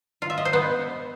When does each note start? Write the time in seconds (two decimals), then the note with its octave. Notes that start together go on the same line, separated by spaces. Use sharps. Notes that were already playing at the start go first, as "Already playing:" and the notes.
0.22 F4
0.30 E5
0.38 D#5
0.45 C5
0.53 B3